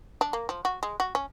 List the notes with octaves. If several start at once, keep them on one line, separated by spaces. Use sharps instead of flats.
D4
A#3
F3
F#4
G#3
F#4
C#4